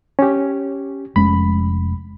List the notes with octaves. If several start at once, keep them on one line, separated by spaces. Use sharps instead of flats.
C#4 G4
F1 G#3 C#4 B5